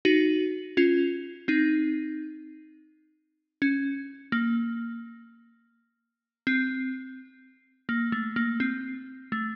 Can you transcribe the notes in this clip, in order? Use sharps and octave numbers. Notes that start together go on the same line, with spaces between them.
D#4 F#4
C#4 F4
C4 D#4
C#4
A#3
C4
A#3
A3
A#3
C4
A3